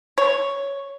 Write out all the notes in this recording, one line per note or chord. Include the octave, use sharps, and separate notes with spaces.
C#5